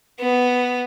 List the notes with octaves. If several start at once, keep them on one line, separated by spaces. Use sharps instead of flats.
B3